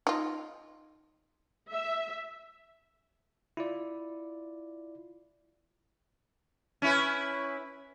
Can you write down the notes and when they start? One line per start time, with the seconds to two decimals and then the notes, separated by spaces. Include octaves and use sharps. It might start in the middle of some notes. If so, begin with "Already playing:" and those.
0.07 D#4 F4
1.71 E5
3.57 E4 F4 D5
6.82 C#4 E4 B4